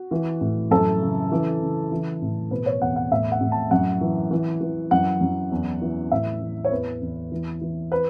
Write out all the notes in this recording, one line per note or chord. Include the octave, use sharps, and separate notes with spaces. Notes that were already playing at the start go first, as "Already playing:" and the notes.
Already playing: F#4
E3
A2
F#2 A4
C#3
E3
C#3
E3
A2
B2 B4
C#5
E2 F#5
F#5
A2 E5
F#5
A2
A5
F#2 F#5
E3
E3
E3
F#2 F#5
F#2
E2
E3
A2 E5
E3
C#5
E2 B4
E2
E3
E3
B4